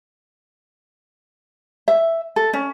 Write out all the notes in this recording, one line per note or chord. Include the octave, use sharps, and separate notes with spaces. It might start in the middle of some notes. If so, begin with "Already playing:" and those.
E5
A4
C#4